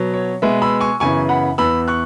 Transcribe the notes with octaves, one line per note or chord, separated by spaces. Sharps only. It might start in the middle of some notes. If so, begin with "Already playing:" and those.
Already playing: B2 F#3 B3
C#5
B2 G#3 B3 B4 E5
B5 E6
G#5 C#6
F#2 C#3 E3 B3 G#5 C#6
F#5 B5
E2 E3 B3 B5 E6
C#6 F#6